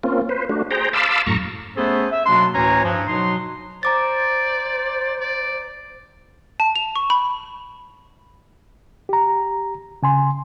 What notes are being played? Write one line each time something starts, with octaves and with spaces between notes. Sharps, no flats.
A#3 C4 C#4 F4
B4 C5
A3 D4 F#4
G#4 C5 G5 A#5
F5 A5 B5 C6 D6 E6
F#2 A2 A#5 C#6
A3 B3 C#4 G#4 A4 C5
E5
B2 F#3 A#3 D4 C6
D2 A2 E3 C#4 C#5 A#5
G2 F3
B2 F#3 D#4 C6
C5 D5 A#5 D6 A6
D5
A5
F7
C#6
B5
G4 A#5
C#3 G#5 C6